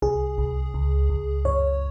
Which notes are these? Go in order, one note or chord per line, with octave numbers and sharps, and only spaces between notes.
C2 G#4
C2
C#2
C#2
F#2 C#5